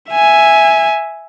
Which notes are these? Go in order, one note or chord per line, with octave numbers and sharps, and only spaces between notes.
E5 G#5